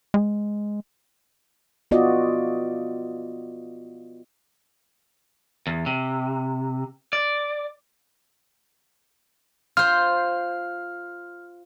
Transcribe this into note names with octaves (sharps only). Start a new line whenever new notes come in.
G#3
B3 F4 F#4 D5 D#5
E2
C3
D5
F4 C5 F6